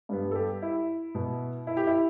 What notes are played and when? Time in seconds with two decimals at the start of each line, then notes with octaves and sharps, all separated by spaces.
0.09 G2 G3 B3
0.31 A4
0.35 G4
0.62 E4
1.15 B2 B3
1.67 E4
1.77 G4
1.87 E4